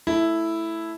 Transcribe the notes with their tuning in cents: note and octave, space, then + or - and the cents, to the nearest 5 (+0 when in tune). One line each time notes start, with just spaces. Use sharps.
A3 +0 E4 +0